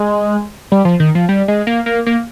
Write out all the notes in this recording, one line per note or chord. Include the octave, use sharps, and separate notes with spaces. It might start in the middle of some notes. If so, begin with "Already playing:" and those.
Already playing: G#3
G3
F3
D#3
F3
G3
G#3
A#3
A#3
A#3